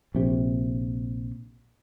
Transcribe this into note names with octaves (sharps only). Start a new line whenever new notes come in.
A#1 C3